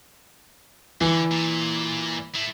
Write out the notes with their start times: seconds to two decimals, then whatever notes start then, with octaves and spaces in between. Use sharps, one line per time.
1.01 D3 E3
1.31 A#2
2.35 A3 E4